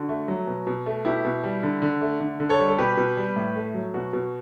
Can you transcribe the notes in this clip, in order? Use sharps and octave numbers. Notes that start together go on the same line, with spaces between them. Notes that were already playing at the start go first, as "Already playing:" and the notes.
Already playing: D3 F#4
A3
F#3
B2
B2
A3
B2 E4 G4
B2
G3
D3
D3
A3
D3
D3
A4 C#5
G3
A4
B2 G4 B4
B2
G3
A2
A3
F#3
B2 F#4
B2